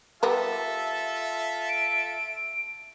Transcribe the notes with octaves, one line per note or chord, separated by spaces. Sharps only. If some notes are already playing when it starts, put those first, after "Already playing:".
G3 B3 F4 A4 A#4 E5
D7